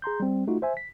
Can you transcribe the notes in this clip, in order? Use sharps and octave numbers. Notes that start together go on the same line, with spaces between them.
G#4 A#5 C6 G6
G3 C4
A3 D#4 F4 F#4
C5 E5 G#5
B6